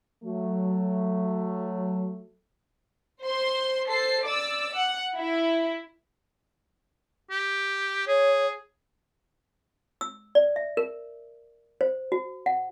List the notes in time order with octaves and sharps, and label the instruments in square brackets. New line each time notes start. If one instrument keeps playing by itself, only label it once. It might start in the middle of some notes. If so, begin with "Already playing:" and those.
[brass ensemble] F#3 A3
[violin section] C5 C6
A4 C5 C7
D5 D6 E6
F#5
E4
[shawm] G4
[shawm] G#4 [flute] C#5
[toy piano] E6
D5
E5
A#4
C5
F#4
F#5